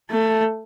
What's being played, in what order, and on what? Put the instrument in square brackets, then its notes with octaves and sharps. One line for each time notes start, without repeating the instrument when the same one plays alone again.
[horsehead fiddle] A3